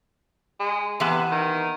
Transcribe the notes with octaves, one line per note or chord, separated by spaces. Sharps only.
G#3
C3 E3 B3 A5
D#3